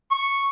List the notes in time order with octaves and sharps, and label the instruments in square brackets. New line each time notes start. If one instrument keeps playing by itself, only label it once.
[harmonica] C#6